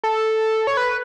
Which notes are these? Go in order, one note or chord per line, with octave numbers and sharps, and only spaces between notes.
A4
C#5
B4